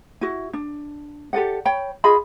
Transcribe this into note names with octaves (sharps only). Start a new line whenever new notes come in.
E4 F#4
D4
G4 A4 D5 F#5
C#5 G5 B5
F4 G#4 D#5 B5